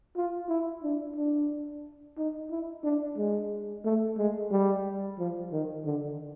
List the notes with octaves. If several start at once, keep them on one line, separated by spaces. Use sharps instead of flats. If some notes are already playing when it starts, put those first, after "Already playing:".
F4
E4
D4
D4
D#4
E4
D4
G#3
A3
G#3
G3
F3
D#3
D3